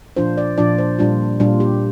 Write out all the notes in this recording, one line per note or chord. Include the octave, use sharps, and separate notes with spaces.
A#2 F3 D4 F4 C5
D5
A#2 F3 D4 F4 D5
C5
A#2 G3 D4 F4
A#2 G3 D4 F4
G4